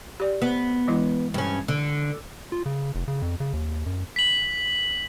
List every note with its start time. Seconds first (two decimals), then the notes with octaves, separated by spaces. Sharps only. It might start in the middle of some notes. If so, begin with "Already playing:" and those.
0.20 G4 D5
0.42 B3
0.88 E3 G#3 E4
1.34 G2 C#4
1.68 D3
2.52 F4
2.66 C#3
2.95 F1
3.08 C#3
3.22 F2
3.40 C#3
3.53 D#2
3.86 F#2
4.16 B6 F#7